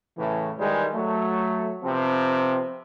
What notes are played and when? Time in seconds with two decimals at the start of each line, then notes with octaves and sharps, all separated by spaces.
0.17 A2 C#3 E3
0.59 D#3 E3 G3 G#3
0.94 F#3 A3
1.83 C3 F3 B3 C4